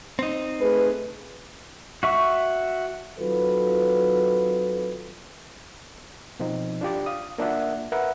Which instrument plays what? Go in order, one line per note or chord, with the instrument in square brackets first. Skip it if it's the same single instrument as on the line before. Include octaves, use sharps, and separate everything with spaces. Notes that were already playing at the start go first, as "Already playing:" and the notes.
[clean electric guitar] C4 D#4
[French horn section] A3 G#4 B4
[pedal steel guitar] F#4 E5 C#6
[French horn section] D#3 F#3 C4 F4 A4 B4
[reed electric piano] B2 F3 C4 D#4
D4 F4 G4 D5
F5 D#6
A#3 D4 F4 E5 F#5
A#4 B4 E5 F#5